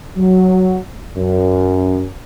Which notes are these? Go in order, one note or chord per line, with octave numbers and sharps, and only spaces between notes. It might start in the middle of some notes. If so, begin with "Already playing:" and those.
F#3
F#2